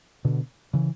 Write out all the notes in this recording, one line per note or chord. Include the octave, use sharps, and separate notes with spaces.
B2 D3
C#3 E3